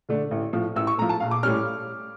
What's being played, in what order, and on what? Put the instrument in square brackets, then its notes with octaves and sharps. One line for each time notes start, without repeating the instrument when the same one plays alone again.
[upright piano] D3 A3 D4
A1
A2 F3
A1 E6
C#6
A2 A#5
F3
A5
A#1 F5
D6
A2 G3 C#4 F6